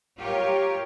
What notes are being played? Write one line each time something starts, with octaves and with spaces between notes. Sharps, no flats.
F4 G4 A#4 C#5